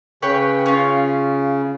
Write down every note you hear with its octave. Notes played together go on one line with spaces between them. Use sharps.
C#3 B4 C#5 G5
C#4 F4